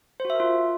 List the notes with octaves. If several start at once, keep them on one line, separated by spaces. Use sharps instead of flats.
C5
F#4
E5
A#4
F4